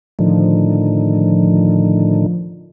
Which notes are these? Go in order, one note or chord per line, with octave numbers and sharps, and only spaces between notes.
A2 D3 D#3 F3